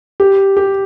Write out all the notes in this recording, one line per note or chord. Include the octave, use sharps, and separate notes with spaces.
G4
G4